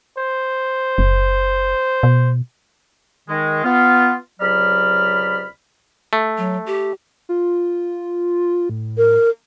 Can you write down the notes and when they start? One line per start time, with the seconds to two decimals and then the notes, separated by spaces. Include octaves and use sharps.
0.18 C5
0.98 F#1
2.03 B2
3.28 D#3 G#3
3.64 B3 F4
4.40 C#2 C3 F#3 D5 B5 F6
6.13 A3
6.38 F#3
6.66 G4
7.29 F4
8.70 A2
8.97 A#4